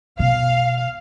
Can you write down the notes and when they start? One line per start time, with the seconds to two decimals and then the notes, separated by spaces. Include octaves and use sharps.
0.19 B2 F5